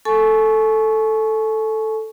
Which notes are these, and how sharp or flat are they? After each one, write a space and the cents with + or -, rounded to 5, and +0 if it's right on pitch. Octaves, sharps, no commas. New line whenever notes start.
A4 +0 G#5 +45 C#6 +0